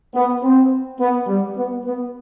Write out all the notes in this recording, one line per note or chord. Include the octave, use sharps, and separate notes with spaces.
B3
C4
B3
G3
B3
B3